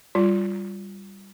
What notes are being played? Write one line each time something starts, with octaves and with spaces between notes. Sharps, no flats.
G3 F4